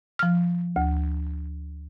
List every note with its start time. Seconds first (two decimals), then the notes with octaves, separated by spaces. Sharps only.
0.19 F3 F6
0.76 D2